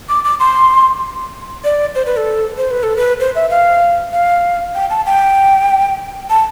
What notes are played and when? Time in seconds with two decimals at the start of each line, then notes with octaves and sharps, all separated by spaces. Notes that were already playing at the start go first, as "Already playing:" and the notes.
0.09 D6
0.24 D6
0.40 C6
1.64 D5
1.95 C5
2.06 B4
2.17 A4
2.58 C5
2.71 B4
2.83 A4
2.97 B4
3.20 C5
3.35 E5
3.50 F5
4.12 F5
4.75 G5
4.90 A5
5.06 G5
6.30 A5